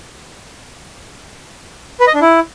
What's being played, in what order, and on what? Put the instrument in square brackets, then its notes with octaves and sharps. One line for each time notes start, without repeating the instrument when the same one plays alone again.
[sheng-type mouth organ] B4
D#5
D4
E4